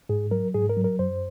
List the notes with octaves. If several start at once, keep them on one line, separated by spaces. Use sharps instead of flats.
G#2 G#4
F#3 A#4
G#2 G#4
A#4
F#3
A#4
F#2 C5